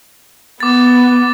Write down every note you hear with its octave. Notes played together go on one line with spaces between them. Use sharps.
B3 D6 A6